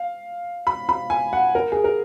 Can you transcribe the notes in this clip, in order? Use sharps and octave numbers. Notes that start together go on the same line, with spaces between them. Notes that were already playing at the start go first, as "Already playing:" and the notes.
Already playing: F5
B5
B5
G#5
F#5
A#4
G#4
A#4